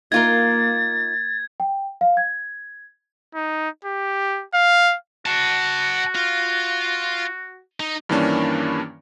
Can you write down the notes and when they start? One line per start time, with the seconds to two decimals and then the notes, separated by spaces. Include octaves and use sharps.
0.12 A#3 D#4 F4 A#4 G#6 A6
1.60 G5
2.01 F5
2.17 G#6
3.35 D#4
3.85 G4
4.54 F5
5.26 F#4 F#5 A5
6.15 F4
7.80 D#4
8.09 G2 D#3 E3 A#3 C#4 D4